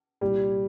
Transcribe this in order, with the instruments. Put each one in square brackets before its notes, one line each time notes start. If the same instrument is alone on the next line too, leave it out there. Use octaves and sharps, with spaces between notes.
[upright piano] C2 A#2 G3